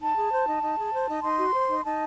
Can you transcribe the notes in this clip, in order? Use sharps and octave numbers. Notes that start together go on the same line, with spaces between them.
D#4 A5
G#4
C5
D#4
D#4
G#4
C5
D#4
D#4 C6
F#4
C5
D#4
D#4 A5